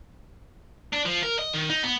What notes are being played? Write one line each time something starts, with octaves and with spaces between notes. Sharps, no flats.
D4
F3
A#4
D#5
D#3
D#4
B3